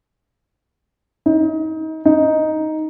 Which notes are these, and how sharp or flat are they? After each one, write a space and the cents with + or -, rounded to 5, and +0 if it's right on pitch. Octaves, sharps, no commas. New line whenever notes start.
D#4 +30
D#4 +5